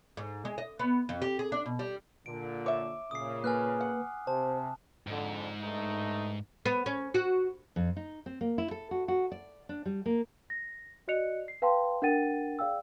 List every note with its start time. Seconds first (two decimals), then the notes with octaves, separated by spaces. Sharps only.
0.17 G#2
0.45 G#3
0.58 D#5
0.79 B3
1.09 F2
1.22 G4
1.39 G#4
1.52 D4
1.66 B2
1.79 G3
2.26 A#2 D3 D7
2.66 C#5 E5 D6
3.11 A#2 C#3 D#6 C7
3.44 A#3 B4 G#5 F6 F#6
3.81 F#5
4.27 C3 C5 A5
5.07 F2 G#2 D3
5.61 G2 A3 D#4
6.66 B3
6.86 C#4
7.14 F#4
7.76 F2
7.97 D#4
8.26 C4
8.41 A#3
8.58 E4
8.71 A4
8.91 F#4
9.08 F#4
9.32 D5
9.69 D4
9.86 G3
10.06 A#3
10.50 A#6
11.08 F#4 D5 D#5 F#6 C#7 F7
11.48 C7
11.62 B4 F5 G5 A5 C6
12.02 D4 A#4 F#5 G5 A6 D#7
12.59 G#4 D5 F5 G5 E6